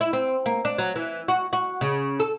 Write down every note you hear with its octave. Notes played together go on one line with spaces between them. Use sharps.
E4
C4
A#3
D4
F#3
E3
F#4
F#4
C#3
A4